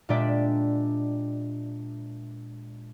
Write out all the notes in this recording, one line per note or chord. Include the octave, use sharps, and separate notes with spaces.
A#2 G#3 D4 G4 D5 E5